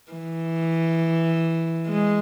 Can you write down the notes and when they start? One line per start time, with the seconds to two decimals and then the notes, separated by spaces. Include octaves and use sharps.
0.12 E3
1.87 G#3